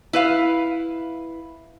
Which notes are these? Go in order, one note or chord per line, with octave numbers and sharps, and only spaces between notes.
E4 B4 F5